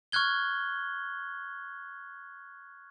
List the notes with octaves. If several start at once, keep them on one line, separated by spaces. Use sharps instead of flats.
C#6 F6 F#6 G#6 G7